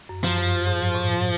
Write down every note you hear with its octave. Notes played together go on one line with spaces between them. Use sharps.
F#2
F#2 F3
G2
G#2
A2